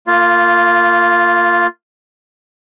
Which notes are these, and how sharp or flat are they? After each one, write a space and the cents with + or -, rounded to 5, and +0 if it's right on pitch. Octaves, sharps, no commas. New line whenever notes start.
A#3 -30 F4 +0